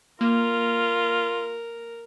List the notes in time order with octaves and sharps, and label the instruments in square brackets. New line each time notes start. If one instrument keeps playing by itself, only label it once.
[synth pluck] A#3 [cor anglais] F4 [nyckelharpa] A#4